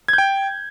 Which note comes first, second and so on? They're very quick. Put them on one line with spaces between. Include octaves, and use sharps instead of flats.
G#6 G6 G5